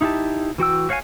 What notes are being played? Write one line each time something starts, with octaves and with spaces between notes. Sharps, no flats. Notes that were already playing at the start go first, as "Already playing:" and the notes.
D#4 E4 G4 A5
E3 F#4 G5 E6
F#4 C#5 F5 F#5 G#5